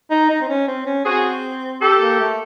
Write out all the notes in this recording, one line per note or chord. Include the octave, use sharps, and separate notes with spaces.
D#4
D#4
C4
C#4
C4
C#4
C4 F#4 G#4
G4 A4
A#3
A3